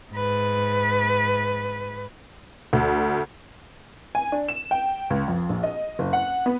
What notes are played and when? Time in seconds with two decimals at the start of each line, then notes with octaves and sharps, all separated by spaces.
0.12 G#2 B4
2.73 D2
4.15 G#5
4.32 D4
4.48 E7
4.71 G5
5.10 C#2
5.28 F2
5.49 A#1
5.63 D#5
5.99 F#1
6.13 F#5
6.46 B3